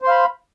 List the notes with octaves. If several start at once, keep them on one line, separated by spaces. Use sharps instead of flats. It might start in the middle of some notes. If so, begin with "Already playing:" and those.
C5 F5 B5 C6